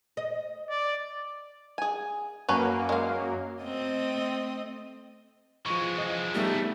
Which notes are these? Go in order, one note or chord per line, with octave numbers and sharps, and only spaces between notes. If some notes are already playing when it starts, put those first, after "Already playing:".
D#5
D5
G#4 G#5
F#2 F#3 A#3 C#4 B4 A5
G#3 F5
A3 C4 D#5
E3 F3 G#3 C#6
F3 D#5
G3 A3 B3 D#4